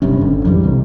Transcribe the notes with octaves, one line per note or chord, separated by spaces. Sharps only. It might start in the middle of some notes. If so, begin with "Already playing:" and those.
F#1 G2 C3 C#4
G#1 D3
F2 E3 F#3 G3
C2 C3